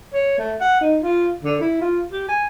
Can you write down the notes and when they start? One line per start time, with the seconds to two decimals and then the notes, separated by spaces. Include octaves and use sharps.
0.14 C#5
0.38 A3
0.61 F#5
0.81 D#4
1.03 F4
1.44 D3
1.61 E4
1.81 F4
2.12 G4
2.29 G#5